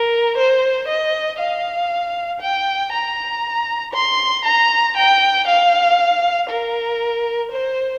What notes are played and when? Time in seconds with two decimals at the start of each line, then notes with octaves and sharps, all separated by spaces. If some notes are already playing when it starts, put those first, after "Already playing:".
Already playing: A#4
0.37 C5
0.88 D#5
1.38 F5
2.41 G5
2.92 A#5
3.94 C6
4.45 A#5
4.97 G5
5.47 F5
6.49 A#4
7.51 C5